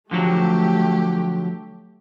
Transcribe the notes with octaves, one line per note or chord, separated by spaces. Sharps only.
D3 F3 F#3 A3 G4